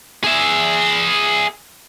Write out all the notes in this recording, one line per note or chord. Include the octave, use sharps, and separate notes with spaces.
G#4 E5